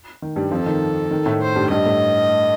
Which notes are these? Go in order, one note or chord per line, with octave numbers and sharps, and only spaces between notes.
D#3
G2 G3
F2 F3 A4
D#3
D#3
A2 A3
C5
G2 G3
G2 G3 D#5
A2 A3